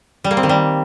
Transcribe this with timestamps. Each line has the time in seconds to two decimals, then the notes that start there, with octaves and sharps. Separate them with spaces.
0.24 G3
0.31 A#3
0.37 C4
0.43 D#3
0.49 G3